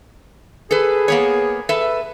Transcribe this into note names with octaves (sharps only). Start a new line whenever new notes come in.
G#4 A4 B4
A#3 B3 C#5
A4 B4 E5